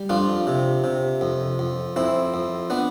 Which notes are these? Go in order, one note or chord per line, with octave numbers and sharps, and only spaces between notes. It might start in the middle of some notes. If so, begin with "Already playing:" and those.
Already playing: G3
F2 D4 F4
C3
C3
F2
F2
F2 C4 E4
F2
B3 D4